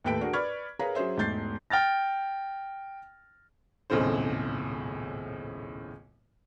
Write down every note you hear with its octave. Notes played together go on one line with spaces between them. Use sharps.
D#2 A2 A4 B4 G5 D7
D4 F#4 G#4 A#4
B4 D5 B5 C#6 F6 G#6
G#4 A#4 B4 C#5 F5 A#5
F#3 C#4 G#4 C5 E5
E1 G#2 A3 G6 A6 C7
G5 F6 A6 A#6
D#1 B1 A2 C#3 C4 C5